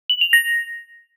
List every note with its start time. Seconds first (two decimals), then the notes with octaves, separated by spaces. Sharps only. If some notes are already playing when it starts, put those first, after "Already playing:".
0.10 F#7
0.21 F7
0.33 A#6